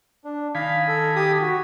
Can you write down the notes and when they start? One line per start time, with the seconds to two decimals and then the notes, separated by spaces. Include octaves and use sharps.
0.24 D4
0.55 D#3 F5 G#5 B5
0.88 A4
1.16 G4 D#6
1.41 F#4